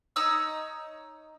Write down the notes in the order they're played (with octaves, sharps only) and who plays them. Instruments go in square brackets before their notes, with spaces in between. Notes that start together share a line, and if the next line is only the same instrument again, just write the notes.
[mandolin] D#4 C#5 D#6 E6